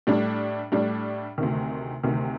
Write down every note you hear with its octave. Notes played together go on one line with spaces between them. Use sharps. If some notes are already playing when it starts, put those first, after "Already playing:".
A2 G3 D4
A2 G3 D4
D2 C3 D#3
D2 C3 D#3